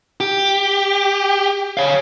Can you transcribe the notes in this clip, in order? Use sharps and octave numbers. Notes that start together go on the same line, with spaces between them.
G4
C#5 F5